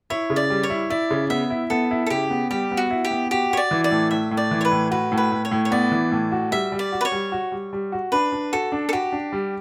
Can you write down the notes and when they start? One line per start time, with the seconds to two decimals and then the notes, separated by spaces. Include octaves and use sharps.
0.10 E4 C#5
0.30 C#3
0.36 D5
0.50 G3
0.63 C#5
0.70 E4
0.90 E4 D5
1.10 C#3
1.30 B3 E5
1.50 E4
1.70 B3 A4
1.91 E4
2.06 A4
2.10 C#3 G4
2.30 B3
2.51 G3 G4
2.71 B3
2.77 F#4
2.91 E4
3.05 G4
3.11 B3
3.31 F#4 G4
3.51 F#4 C#5
3.57 D5
3.71 E3
3.84 D5
3.91 A2
4.11 A2 E5
4.31 A2
4.37 D5
4.51 E3
4.61 C#5
4.65 B4
4.71 A2
4.91 F#4 B4
5.12 A2
5.18 B4
5.32 A2
5.45 C#5
5.51 A2
5.65 C#5
5.71 B3 D5
5.92 E3
6.12 A2
6.32 F#4
6.51 G3 E5
6.72 G3
6.79 D5
6.92 F#4
7.01 B4
7.05 C#5
7.12 G3
7.32 F#4
7.52 G3
7.73 G3
7.92 F#4
8.12 D4 B4
8.32 D4
8.53 F#4 A4
8.72 D4
8.89 A4
8.93 F#4 G4
9.12 D4
9.32 G3